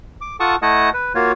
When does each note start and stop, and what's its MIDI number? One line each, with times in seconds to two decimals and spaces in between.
0.21 0.36 86
0.40 0.56 65
0.40 0.56 69
0.40 0.56 78
0.40 0.56 81
0.40 0.56 85
0.40 0.56 87
0.62 0.90 57
0.62 0.90 64
0.62 0.90 75
0.62 0.90 78
0.62 0.90 81
0.62 0.90 87
0.94 1.13 71
1.15 1.32 58
1.15 1.32 65
1.15 1.32 66
1.15 1.32 73